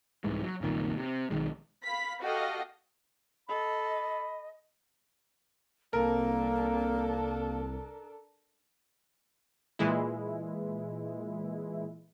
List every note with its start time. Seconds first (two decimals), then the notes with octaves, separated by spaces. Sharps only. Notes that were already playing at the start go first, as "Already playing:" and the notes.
0.24 C2 G#2 E3 G#3
0.43 F#3
0.61 F#1 C2 A#2 D#3
0.97 C3
1.30 B1 D#3 G#3
1.83 F5 B5 B6
2.20 F#4 G4 A4 D#5 F5
3.49 A4 D#5 B5
5.93 C2 A#3 D4 A4 A#4
9.79 A#2 E3 G#3 E4